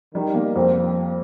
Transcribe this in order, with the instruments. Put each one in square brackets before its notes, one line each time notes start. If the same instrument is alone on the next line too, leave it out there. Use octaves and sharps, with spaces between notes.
[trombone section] D#3 [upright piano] G3
[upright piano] A#3
[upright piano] F2 [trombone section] C4